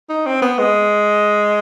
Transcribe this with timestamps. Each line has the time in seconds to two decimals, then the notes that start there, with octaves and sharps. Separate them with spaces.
0.09 D#4
0.26 C4
0.42 B3
0.58 G#3